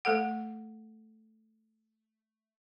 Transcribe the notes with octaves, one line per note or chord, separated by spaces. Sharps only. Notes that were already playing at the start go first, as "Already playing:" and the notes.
A3 A4 F#5